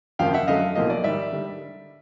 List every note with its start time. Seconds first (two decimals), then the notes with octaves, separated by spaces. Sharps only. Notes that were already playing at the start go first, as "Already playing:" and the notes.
0.19 G#1 F#2 C#3 F3 A#3 F5 G5
0.34 E5 F#5
0.48 F#2 D3 F#3 A3 D#5 F5
0.76 B1 A2 F3 A#3 D#5
0.90 D5
1.04 G#2 D#3 G3 D5 E5
1.32 D3 G3